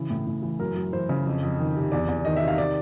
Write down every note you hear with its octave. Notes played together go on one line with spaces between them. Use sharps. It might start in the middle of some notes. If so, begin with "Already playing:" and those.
Already playing: C#3 E3
A2
A2
E3
F#2 A#4
F#2
E3 C5
C#3
F2
F2
D#3
C3
E2 D5
E2
D#3 D#5
E5
C3
F5
D#3 D5